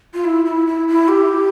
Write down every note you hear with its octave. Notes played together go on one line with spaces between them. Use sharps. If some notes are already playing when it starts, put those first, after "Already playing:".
F4
E4
E4
E4
E4
G4